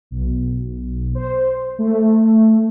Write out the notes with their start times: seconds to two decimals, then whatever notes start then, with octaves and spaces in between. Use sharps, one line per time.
0.11 B1
1.15 C5
1.79 A3